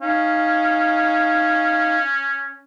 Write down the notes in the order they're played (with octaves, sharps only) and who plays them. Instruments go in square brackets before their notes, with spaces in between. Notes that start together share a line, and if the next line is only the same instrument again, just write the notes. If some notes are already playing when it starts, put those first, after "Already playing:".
[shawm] C#4 [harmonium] D#4 F5